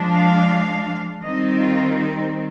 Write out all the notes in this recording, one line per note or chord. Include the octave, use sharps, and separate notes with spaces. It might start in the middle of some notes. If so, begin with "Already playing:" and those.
Already playing: F3 G#3 D4
F5
D#3 G3 C4 D#4 D#5
F4
D#4